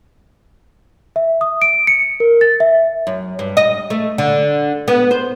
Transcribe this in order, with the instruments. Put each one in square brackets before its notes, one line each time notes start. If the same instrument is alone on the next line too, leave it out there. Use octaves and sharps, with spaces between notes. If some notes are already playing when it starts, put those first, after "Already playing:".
[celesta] E5
D#6
D7
C#7
A#4
A6
E5
[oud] F#2
G2
D#5
A3
D3
B3
C5